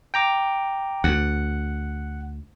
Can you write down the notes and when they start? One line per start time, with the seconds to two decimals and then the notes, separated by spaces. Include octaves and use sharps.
0.14 G5 A#5 D6
1.04 D2 F#5